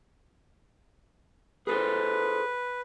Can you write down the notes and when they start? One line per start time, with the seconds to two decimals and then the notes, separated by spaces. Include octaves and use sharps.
1.67 G#4 A4 B4 C5